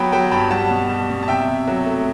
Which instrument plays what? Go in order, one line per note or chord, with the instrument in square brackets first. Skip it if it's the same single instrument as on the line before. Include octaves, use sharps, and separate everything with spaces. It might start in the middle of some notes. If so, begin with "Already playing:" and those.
Already playing: [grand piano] F#3 B3 G5 B5
F#3 G5 B5
G2 G5 B5
G3 F#5 A5
B2
G3
B2
A5
C3 E5 G5
C3
F#3
A3